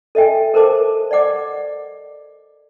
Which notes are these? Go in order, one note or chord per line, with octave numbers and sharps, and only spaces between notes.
A4 D#5 E5 G5 G#5
A4 A#4 C5 A5 D6
D5 D#5 F#5 D6